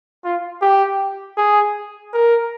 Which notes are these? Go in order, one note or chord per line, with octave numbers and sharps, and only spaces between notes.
F4
G4
G#4
A#4